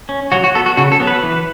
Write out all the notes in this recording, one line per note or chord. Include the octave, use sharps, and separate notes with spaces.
C#4
F#3 F#4
F#4
B3 A4
F#4
C#3 F#4
A4
F#3 B3
B4
E3